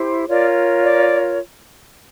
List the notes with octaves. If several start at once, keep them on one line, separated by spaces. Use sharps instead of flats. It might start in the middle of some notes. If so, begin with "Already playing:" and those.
Already playing: E4 G4 C5
F4 A#4 C#5 D5
D5